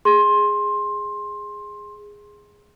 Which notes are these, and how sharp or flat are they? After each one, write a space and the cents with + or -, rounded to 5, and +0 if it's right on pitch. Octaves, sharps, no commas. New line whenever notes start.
G#4 -10 C6 +15